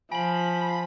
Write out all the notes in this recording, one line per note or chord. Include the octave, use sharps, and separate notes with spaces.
F3 G#5 B5 F#7